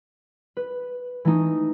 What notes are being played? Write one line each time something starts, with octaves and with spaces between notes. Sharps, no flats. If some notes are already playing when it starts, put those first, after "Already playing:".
B4
E3 A3 D#4